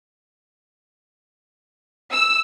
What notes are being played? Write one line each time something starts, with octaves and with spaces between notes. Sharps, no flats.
E6